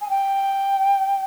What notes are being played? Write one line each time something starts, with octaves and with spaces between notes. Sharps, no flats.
G#5
G5